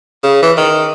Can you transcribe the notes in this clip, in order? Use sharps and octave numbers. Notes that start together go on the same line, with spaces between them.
C#3
E3
D#3